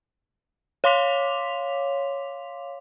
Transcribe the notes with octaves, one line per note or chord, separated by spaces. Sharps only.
C#5 F5 C6 D6 B6 F7